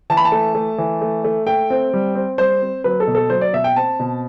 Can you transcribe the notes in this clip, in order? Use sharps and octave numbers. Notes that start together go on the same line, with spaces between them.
E3 A5
B5
A5
A3
A3
E3
A3
A3
A3 G5
C4
G3
C4
G3 C5
C4
F#3 B4
A4
B2
A4
F#3 C5
D5
B2 E5
G5
C4 A5
B2